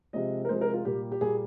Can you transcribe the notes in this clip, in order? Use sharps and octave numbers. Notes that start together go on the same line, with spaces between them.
C3 F3 G#3 D#5
A#4
C3 F3 G#3 C5
A#4
F4
A#2 G3 A#3 G4
G4
A#2 G3 A#3 G#4